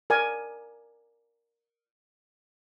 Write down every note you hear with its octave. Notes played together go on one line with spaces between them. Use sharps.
A#4 D5 G#5